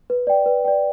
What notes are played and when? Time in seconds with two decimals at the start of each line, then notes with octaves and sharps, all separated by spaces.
0.10 B4
0.27 D5 G5
0.46 B4
0.65 D5 G5